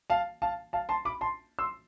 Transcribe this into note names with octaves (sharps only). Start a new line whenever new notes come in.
F5 A5
F5 A5
F5 A5
A5 C6
B5 D6
A5 C6
C6 E6